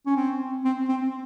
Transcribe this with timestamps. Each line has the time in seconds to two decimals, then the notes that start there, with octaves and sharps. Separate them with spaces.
0.06 C#4
0.16 C4
0.65 C4
0.88 C4